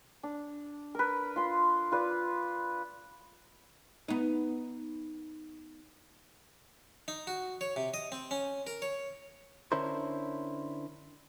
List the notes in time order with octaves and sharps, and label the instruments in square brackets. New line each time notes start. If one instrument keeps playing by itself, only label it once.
[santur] D4
A#4 B4
F4 C6
F4 B4 D5
[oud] B3 D#4
[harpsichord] D#4
F#4
C#5
C3
D#5
C4
C#4
A#4
C#5
[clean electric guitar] D3 C#4 D4 E4 A#4 C5